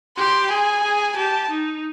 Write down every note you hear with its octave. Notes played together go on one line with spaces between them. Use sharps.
G4 C6
G#4 G#5
G#4
G4 A5
D#4